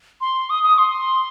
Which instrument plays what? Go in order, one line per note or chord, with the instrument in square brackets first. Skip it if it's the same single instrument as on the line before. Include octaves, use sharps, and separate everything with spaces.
[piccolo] C6
D#6
D#6
C6